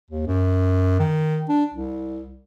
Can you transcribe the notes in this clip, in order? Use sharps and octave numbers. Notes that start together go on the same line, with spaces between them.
D#2
F#2
D#3
D4
C2